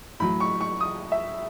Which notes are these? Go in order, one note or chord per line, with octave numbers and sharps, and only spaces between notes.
A2 F#3 B5
C#6
C#6
D#6
E5